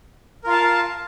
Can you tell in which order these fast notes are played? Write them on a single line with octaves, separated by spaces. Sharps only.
A#4 F4 F5 A5